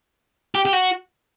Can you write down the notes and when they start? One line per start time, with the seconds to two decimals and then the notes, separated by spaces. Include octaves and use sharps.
0.55 G4
0.65 G4
0.73 F#4